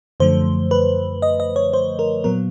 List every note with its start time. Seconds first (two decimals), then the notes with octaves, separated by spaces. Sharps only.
0.20 F#2 D3 F3 A3 C5
0.71 B4
1.22 D#5
1.40 D#5
1.56 C#5
1.73 C5
1.99 A#4
2.24 A#2 F#3 B3 A#4